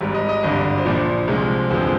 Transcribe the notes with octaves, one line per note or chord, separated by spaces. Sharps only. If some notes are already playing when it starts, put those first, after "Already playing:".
G#1 G#2 G3
D#5
D#5
G#1 G2 D3
C5
A#1 A#2 F3 D5
C2 C3 F3 G#3
G1 F2 D3 F3 G#3 C5